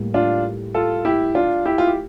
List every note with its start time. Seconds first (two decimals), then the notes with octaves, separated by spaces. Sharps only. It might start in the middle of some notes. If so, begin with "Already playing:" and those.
Already playing: A2 G3 A#3
0.14 D4 F4
0.74 F4 A4
1.05 E4 G4
1.35 D4 F4
1.65 E4 G4
1.78 F4
1.87 G4